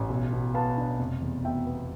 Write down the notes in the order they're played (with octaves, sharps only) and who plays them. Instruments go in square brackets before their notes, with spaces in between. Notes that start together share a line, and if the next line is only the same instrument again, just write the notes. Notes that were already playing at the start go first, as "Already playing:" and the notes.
Already playing: [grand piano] A1
B1
B2
B3 F5 A5
D4
F1
E2
B2 E5 G5
B3